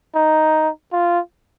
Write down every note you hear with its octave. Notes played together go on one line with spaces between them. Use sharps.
D#4
F4